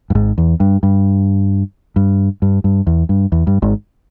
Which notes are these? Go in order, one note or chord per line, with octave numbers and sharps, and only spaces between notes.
G2
G#1 G#2
E2
G2
G2
G2
G2
G2
E2
G2
E2
G2
G#1 G#2